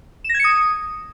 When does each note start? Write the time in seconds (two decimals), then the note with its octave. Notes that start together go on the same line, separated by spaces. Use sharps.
0.24 E7
0.29 A#6
0.34 G#6
0.39 C#7
0.45 D#6